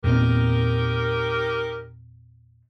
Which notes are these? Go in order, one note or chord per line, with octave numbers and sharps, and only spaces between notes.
E2 A#2 C4 D#4 G4 A#4